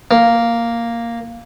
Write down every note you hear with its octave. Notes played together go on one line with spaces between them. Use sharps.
A#3